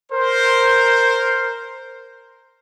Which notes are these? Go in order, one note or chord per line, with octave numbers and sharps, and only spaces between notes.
A#4 C5